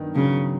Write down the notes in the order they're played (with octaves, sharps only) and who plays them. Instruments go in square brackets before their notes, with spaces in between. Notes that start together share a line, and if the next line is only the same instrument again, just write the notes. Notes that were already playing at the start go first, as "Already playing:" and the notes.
Already playing: [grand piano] G2 D#3 F#3 B3
[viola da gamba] C#3 [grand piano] F#3